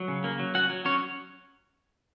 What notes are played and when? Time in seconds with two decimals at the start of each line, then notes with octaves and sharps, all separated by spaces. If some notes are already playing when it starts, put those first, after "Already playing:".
Already playing: F#3
0.08 C#3
0.24 A#3
0.39 F#3
0.54 C#4 F#4 F#5
0.70 F#3
0.85 F#3 C#4 C#5